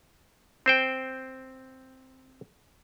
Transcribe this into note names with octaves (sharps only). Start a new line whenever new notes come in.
C4 C5 G5